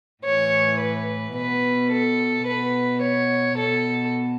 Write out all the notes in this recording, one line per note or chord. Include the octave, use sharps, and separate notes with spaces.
A2 E3 C#5
B4
B2 B4
A4
B2 B4
C#5
B2 A4